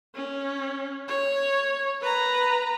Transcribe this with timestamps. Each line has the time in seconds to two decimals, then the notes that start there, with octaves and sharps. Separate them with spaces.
0.15 C#4
1.08 C#5
2.01 B4 A#5